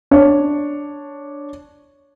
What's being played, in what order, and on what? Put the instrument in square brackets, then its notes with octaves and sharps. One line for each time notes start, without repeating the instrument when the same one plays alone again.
[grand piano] D4 C#5